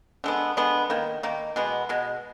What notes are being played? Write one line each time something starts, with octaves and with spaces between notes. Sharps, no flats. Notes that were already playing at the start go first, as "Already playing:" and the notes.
D3 G#3 B3
D3 G#3 B3
D#3 A#3
D#3 A#3
B2 G#3 B3
B2 G#3